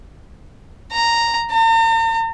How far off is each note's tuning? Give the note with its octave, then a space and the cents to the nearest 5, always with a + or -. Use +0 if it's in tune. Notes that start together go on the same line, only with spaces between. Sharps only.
A#5 -5
A#5 -45